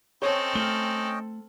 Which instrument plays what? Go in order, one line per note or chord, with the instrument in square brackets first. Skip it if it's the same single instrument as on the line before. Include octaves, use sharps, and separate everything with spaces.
[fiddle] C4 A4 [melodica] C#4 D#5 G5 [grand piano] C#5
[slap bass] A3 [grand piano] F6 F#7 G7